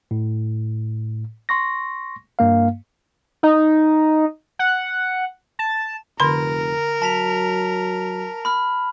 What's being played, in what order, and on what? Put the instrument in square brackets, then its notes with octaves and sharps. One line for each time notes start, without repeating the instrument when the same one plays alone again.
[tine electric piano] A2
C6 C#6 A#6
G2 A#3 F5
[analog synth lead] D#4
F#5
A5
[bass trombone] F1 [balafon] D3 C6 [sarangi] A#4
[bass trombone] F#3 [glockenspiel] A5 B6 F7
[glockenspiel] B5 F6